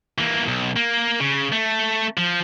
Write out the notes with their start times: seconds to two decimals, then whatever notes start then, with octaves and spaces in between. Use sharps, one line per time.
0.18 E3 A#3
0.48 B1
0.76 A#3
1.20 C#3
1.52 A3
2.17 F3